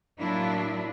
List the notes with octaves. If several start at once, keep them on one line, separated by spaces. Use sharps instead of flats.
A2 F#3 A#3 D4 E4 F4